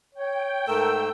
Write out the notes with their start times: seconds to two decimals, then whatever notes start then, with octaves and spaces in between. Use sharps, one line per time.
0.14 C#5 G5
0.68 G#2 A3 A4 A#4 E6